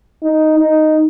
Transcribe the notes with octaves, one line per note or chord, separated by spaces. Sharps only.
D#4
D#4